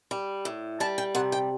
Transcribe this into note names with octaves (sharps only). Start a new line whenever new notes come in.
G3
A2
G3 A5
G5
C3 F#5
G5